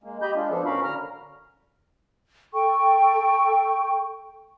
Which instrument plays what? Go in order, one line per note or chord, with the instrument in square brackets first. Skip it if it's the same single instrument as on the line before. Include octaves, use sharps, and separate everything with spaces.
[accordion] G#3 A#3
G4 D#5 B5 G6
G#3 D4 F4
F3 B3 D4 A4
A2 C#4 F#4 A#4 F5 B5
D3 A#5 F6
[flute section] A4 G5 C#6